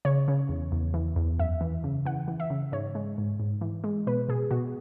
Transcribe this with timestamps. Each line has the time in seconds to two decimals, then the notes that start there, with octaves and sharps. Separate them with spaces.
0.05 C#3 C#5
0.28 C#3
0.49 E2
0.72 E2
0.94 E3
1.16 E2
1.39 F#2 E5
1.61 E3
1.84 C#3
2.05 E3 F#5
2.28 E3
2.40 E5
2.50 C#3
2.72 G#2 C#5
2.95 G#3
3.18 G#2
3.40 G#2
3.61 E3
3.84 G#3
4.07 B2 B4
4.29 B2 G#4
4.51 B2 F#4